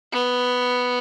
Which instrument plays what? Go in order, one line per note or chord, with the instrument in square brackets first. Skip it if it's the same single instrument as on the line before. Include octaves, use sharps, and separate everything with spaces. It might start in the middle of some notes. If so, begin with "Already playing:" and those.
[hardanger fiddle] B3